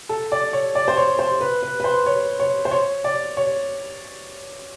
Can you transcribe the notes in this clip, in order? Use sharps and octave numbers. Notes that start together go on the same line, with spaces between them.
A4
D5
C#5
D5
C5
C#5
C5
B4
B4
B4
C5
C#5
C#5
C5
C#5
D5
C#5